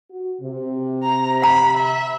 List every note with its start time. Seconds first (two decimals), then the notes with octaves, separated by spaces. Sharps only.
0.10 F#4
0.42 C3
1.04 A#5
1.42 F#5 A#5 B5
1.77 E5